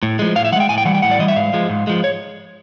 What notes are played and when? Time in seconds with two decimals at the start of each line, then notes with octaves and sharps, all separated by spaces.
0.03 A2
0.19 F3 G#3
0.35 A2 F5
0.45 E5
0.52 F3 F#5
0.56 G#3 G5
0.69 A2 G#5
0.78 G5
0.85 E3 G3 F#5
0.95 G5
1.02 A2 F#5
1.11 D5
1.19 E3 G3 D#5
1.28 E5
1.36 G#2 F5
1.53 F3 G#3
1.69 G#2
1.87 F3 G#3
2.04 C#5